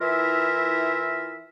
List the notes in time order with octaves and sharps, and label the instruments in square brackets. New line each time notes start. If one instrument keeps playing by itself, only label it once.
[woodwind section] E3 E4 F4 A#4 E5